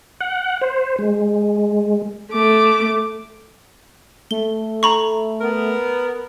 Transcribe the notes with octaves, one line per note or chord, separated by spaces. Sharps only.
F#5
C5
G#3
A3 D6
A3 G7
A#5 B5 C#6
B3 A#4